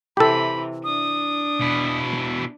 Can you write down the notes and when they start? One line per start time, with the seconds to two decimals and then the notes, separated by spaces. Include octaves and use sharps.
0.17 C3 E3 G4 A4 B5
0.84 D4 D#6
1.61 B2 E4